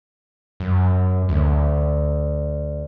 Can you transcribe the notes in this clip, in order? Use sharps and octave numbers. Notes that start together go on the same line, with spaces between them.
F#2
D2